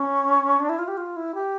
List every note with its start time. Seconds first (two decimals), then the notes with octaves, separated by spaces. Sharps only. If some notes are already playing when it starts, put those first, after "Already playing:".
Already playing: C#4
0.59 D4
0.69 E4
0.79 F4
0.88 G4
0.97 F4
1.16 E4
1.35 G4